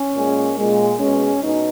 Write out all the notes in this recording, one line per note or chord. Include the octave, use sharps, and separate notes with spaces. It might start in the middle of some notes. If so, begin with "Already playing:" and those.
Already playing: C#4
A#2 G#3
A#2 G#3
B2 G#3 C#4
B2 D#4